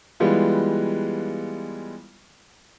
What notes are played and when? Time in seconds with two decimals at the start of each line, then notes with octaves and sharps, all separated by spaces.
0.20 E3 G3 G#3 B3 F4